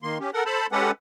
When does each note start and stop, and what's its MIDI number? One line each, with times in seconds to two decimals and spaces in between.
0.03 0.18 51
0.03 0.18 58
0.03 0.18 84
0.20 0.31 61
0.20 0.31 67
0.33 0.44 69
0.33 0.44 70
0.33 0.44 78
0.46 0.67 69
0.46 0.67 72
0.46 0.67 81
0.46 0.67 83
0.72 0.91 56
0.72 0.91 61
0.72 0.91 67
0.72 0.91 69
0.72 0.91 71
0.72 0.91 78